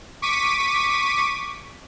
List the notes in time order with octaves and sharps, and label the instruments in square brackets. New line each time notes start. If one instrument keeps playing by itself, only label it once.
[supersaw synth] C#6 D6 B6 D#7